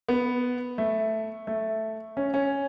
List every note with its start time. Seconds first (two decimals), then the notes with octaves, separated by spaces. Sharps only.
0.09 B3
0.78 A3
1.47 A3
2.17 C#4
2.34 C#4